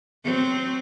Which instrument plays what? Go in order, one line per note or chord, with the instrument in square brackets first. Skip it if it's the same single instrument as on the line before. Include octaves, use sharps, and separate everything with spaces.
[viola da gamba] F#3 C4